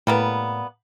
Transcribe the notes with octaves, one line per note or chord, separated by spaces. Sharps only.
A2 G3 A#3 B3